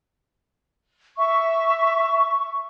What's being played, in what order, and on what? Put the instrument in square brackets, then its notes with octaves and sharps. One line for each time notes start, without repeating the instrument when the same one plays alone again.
[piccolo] E5 [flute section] C#6